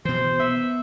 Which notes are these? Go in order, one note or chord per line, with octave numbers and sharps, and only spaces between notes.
B2 E3 C5
B3 E5